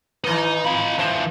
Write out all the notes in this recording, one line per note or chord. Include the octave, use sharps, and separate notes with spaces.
G#2 D#3 E3 D#4 B4
D#4 F4 B5
E3 D4 C5